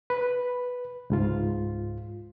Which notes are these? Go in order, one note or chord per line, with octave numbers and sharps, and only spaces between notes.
B4
C#2 G#2 F4